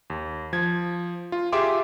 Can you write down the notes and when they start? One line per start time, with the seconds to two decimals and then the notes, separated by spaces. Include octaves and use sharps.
0.10 D#2
0.53 F3 G#6
1.32 F4
1.52 F4 G4 G#4 E5 C6 D6